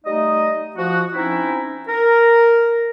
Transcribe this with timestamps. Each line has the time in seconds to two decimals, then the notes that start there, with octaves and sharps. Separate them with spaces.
0.05 G3 A3 D#4 D#5
0.76 F3 F#4
1.13 C4 C#4 D#4 E4
1.88 A#4